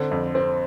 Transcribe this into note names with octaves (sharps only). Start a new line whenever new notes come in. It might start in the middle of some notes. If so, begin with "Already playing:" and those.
Already playing: D3 C4
F2
C4